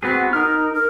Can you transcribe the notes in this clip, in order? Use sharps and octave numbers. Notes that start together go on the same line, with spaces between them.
B3 C4 F#4 G#4
D#4 A#4 F6
A#4